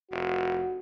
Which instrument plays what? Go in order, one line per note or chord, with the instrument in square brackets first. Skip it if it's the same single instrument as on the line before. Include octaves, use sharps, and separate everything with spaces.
[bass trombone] F1 [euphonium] F#4